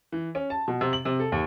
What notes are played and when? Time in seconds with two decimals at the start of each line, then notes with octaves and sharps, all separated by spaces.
0.12 E3
0.35 C#4
0.50 A5
0.68 B2
0.81 C3
0.93 F#7
1.05 C3
1.20 A4
1.32 D#2